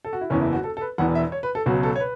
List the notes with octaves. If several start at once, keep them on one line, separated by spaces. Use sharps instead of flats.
A4
F#4
E4
F#1 E2 E3 C#4
E4
F#4
A4
A4
B4
E1 E2 E3 F#5
E5
C#5
B4
A4
C#2 B2 F#3 F#4
A4
C#5
B4